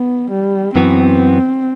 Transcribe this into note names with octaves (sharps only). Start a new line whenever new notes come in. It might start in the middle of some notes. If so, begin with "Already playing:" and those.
Already playing: B3
G3
F#2 E3 B3 C4 F#4